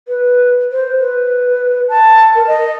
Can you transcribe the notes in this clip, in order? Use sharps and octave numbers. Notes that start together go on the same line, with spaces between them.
B4
C5
B4
A5
A#4
D#5